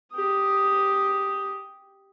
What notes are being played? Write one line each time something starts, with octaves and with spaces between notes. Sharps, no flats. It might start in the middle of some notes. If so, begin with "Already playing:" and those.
G4 D#6